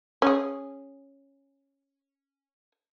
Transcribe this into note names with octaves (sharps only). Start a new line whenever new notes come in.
C#4 G#4